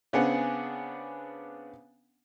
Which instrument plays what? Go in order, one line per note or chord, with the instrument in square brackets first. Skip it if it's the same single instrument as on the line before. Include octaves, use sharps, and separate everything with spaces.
[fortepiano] C#3 B3 C4 D4 G#4 F#5